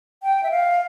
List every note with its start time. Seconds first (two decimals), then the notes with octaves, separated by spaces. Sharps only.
0.23 G5
0.43 E5
0.51 F5